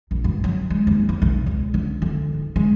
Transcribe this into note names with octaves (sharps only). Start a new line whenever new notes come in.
A#1
G2
F#3
G#3
D#2
E2
B1
C#2
D3
D3
G#2
G#3